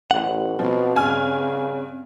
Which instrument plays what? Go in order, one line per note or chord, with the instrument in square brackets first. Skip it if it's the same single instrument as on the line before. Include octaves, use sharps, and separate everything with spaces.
[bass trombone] A1 [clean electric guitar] F#5
[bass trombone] B2 [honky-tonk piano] F3 [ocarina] C4
[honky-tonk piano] G2 G#5 F6 [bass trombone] C#3